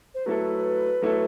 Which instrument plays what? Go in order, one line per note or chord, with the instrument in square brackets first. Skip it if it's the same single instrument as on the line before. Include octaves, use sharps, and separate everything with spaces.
[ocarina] C5
[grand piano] F#3 A3 E4 A4 [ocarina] B4
[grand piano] F#3 A3 E4 A4